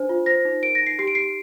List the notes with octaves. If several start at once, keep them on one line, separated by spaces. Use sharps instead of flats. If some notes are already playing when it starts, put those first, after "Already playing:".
Already playing: D4 C5
F4
C5 A#6
D#4
A#4 D7
A#6
D#4
C7
G4 C7
D7
G4 C7